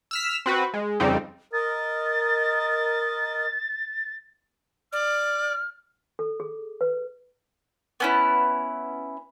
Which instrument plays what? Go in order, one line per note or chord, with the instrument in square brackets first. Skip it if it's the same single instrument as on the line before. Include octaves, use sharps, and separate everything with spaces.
[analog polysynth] E6 F6 B6
C4 F#4 B4
G#3
F2 C#3 G3 C4 D#4
[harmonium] A#4 D#5 [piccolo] A6
[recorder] D5 [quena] F6
[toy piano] A4
G#4
B4
[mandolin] B3 C#4 E4